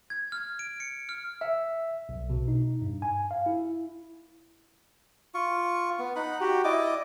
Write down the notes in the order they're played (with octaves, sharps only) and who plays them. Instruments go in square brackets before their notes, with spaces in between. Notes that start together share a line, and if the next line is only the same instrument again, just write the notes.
[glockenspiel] G#6
F6
D7
C#7
F6
[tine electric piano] E5
B1
B2
D#4
G2
G#5
F5
E4
[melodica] F4 C#6
B3
D#4 F#5 B5
F#4 G4
E4 D5 D#5 D6